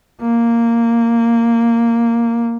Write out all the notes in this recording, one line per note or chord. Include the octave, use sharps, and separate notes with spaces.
A#3